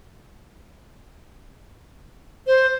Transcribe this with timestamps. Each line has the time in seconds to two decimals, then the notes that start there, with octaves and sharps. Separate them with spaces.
2.47 C5